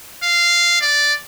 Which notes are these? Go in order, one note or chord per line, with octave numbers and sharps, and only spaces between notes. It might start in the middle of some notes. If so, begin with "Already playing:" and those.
F5
D5